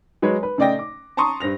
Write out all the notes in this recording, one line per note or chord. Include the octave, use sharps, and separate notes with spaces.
F#3 G#3 B4 C#5
B4
C#3 A3 D5 D#5 G5 A#6
D6
A5 A#5 C6 C#6 D#6
G2 C5 A#6 F7